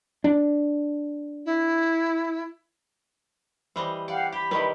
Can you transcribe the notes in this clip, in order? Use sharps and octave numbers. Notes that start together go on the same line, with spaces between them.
D4
E4
E3 G3 C5 D#5
G4 D5 F5 F#5
G4 B5
C3 D#3 G3 B4